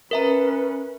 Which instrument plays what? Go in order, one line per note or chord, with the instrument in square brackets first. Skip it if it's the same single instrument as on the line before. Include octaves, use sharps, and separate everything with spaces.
[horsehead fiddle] C#4 B4 [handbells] A#4 E5 A#5